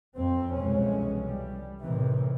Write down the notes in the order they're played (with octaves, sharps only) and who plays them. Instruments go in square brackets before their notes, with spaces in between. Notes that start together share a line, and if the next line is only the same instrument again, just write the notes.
[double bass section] F2 C4
C2 F2 B2 E3 G#3 C#4
G3
A2 C3 D#3 E3